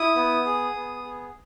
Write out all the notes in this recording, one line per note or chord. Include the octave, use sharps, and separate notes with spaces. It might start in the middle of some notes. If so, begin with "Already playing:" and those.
Already playing: E4 D#6
B3
G#4
B3
G#4